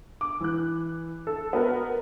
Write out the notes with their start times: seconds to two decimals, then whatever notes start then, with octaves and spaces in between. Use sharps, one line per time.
0.21 D6
0.41 E3 F#6
1.27 A4
1.53 B3 F#4 A#4 B4